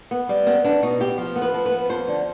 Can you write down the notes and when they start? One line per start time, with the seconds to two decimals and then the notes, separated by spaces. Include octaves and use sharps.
0.11 B3
0.29 G3
0.47 B3 C4
0.64 B3 D4
0.82 B2 D#4
1.00 B3 G4
1.18 F3
1.36 B3
1.42 B4
1.54 F3
1.66 B4
1.72 B3
1.89 F2 C5
2.08 D3